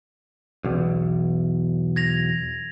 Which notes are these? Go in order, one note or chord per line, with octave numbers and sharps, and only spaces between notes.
B1 E2
G#6 A#6 F7